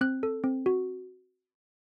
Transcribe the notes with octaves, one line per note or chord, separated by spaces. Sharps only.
C4 F#6
A4
C4
F#4